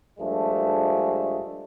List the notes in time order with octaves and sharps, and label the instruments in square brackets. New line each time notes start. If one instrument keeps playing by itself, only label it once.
[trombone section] G2 F3 G#3 A3 D4